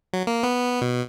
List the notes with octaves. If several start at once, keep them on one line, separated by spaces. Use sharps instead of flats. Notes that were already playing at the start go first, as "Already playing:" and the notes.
F#3
A#3
B3
B2